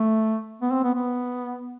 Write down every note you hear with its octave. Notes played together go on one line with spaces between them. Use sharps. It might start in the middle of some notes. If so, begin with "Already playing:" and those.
Already playing: A3
B3
C4
B3
B3